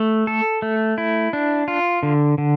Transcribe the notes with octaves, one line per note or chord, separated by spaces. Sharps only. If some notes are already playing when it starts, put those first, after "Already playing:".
Already playing: A3
A4
A3
E4
D4
F4
D3
D3